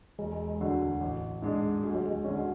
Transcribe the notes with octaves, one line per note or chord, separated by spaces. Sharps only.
E1 G#3
D2 D3 F#3
A1
G#2 G#3 D4 G#4
D2 G#3
F#3
G#3
D3 F#3 C#4